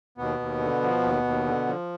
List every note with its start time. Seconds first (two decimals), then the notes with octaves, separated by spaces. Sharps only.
0.18 D#2 B2 B3
0.39 D#2
0.60 D3
0.82 F3
1.03 D#2
1.24 D#2
1.46 D3
1.67 F3